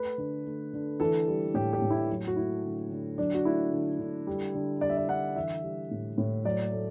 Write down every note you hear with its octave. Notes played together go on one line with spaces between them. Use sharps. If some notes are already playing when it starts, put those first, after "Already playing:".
Already playing: A3 B4
D3
A3
D3
E3 A4
G3
A2 G4
G4
A2
E4
F#3
F#4
A3 E4
D3
D3
F#3 D4
F#4
A3 E4
D3
D3
G3
D3
G3 D5
E5
D5
D3 F#5
E3 E5
G3
A2
A2
F#3 D5
A3